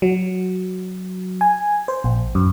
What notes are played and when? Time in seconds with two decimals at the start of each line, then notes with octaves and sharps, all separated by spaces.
0.02 F#3
1.41 G#5
1.88 C5
2.04 A#1
2.35 F#2